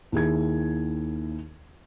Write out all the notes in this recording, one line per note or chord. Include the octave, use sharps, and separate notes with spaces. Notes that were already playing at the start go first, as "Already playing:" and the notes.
D#2 E4 G#4 G#6